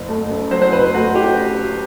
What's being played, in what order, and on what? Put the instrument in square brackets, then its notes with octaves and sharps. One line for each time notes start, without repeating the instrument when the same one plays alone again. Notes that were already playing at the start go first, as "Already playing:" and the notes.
Already playing: [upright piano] F#1
A3
F#2
F#3 C5
C5
F#1 B4
A3 F#4
F#2 G4